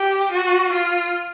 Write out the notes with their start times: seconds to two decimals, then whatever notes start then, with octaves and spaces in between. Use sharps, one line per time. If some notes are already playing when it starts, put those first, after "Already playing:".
Already playing: G4
0.32 F#4
0.73 F4